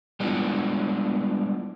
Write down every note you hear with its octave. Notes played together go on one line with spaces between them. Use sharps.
G3 G#3 B3 D4 E4 F4